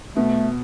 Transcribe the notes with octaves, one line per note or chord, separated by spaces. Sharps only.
B2 A3